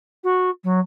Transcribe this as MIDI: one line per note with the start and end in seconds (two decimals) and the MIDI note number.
0.24 0.50 66
0.64 0.79 54